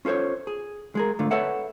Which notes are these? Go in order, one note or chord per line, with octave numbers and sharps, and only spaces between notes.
C#4 F4 A4 C5 C#5
G#4
G#3 G#4 A#4
G#2 D3 A3 F4
A4 B4 C#5 E5 F#5